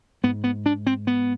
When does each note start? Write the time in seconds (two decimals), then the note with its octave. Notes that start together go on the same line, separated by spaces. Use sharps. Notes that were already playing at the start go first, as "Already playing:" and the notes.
0.23 G#2 B3
0.44 B3
0.66 D4
0.87 C4
1.07 B3